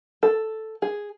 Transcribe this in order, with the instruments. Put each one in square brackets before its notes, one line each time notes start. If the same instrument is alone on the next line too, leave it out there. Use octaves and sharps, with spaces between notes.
[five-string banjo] A4
G#4